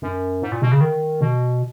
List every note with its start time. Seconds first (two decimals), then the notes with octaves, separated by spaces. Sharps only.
0.02 F#2
0.42 G#2
0.52 A#2
0.62 B2
0.72 C#3
0.81 D#3
1.21 B2